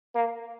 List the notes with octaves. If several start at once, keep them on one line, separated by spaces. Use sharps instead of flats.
A#3